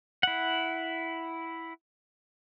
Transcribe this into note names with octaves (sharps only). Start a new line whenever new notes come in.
E4 F#5